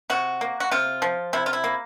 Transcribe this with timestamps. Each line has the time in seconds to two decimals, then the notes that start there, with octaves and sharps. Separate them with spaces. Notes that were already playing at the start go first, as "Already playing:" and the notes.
0.10 C3 F#4
0.41 A#3
0.60 F#4
0.71 C3 F4
1.02 F3
1.33 C3 E4
1.46 F4
1.53 E4
1.64 A#3